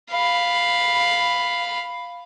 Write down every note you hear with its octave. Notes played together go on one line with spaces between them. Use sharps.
F5 B5